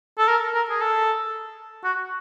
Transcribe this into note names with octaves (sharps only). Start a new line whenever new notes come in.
A4
A#4
A#4
G#4
A4
F#4